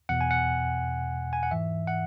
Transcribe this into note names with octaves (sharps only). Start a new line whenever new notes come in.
E2 B2 F#5
G#5
F#5
G#5
F#5
G#2 E3 E5
F#5